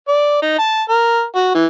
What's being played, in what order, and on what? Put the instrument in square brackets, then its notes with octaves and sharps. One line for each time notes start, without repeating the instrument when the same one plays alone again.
[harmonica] D5
D#4
A5
A#4
F#4
E3